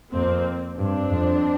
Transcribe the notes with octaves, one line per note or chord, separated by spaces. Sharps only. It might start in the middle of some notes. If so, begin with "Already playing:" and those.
F2 A#3 C4
G2 C4 D4
F2